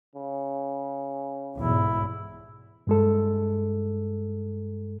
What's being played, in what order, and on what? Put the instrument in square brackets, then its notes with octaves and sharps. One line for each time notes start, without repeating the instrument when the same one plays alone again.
[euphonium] C#3
[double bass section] B1 E2 G#2 [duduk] E4
[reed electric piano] G2 G#3 A4